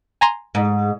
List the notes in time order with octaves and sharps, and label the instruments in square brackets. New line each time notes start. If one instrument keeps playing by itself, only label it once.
[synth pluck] G#5 A#5 C6
[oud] G#2